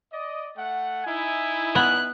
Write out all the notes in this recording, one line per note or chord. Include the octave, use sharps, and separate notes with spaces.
D5 D#5
A3 F#5
D#4 E4 G#5
B3 F#6